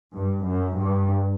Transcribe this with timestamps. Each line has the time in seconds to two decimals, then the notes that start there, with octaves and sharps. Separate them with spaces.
0.14 G2
0.46 F#2
0.79 G2